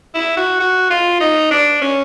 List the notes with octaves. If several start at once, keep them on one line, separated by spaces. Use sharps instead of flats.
E4
F#4
F#4
F4
D#4
D4
C#4